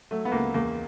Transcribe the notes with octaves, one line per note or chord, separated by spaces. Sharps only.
F#3 A3
B3
C#2 A#3
E2 A#3